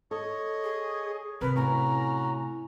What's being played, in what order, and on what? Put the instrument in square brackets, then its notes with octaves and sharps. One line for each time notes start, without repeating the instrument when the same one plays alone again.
[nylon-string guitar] A4 [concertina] C#5 D#5
[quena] G#4
[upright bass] C3 [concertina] A#4 [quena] B4
[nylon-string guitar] A2 [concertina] C#4 F#4 [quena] A#5